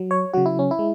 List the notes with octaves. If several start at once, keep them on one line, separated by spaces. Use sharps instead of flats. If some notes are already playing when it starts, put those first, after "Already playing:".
Already playing: F#3
C#5
C#3 F#3 F#4
E4
C#4
E4
G#3